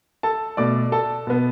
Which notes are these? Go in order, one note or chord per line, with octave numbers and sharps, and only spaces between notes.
A4 A5
B2 A3 D5 D6
A4 A5
B2 B3